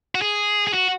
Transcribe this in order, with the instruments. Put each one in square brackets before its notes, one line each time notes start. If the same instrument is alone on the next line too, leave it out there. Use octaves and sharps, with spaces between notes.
[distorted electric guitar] F#4
G#4
G#4
F#4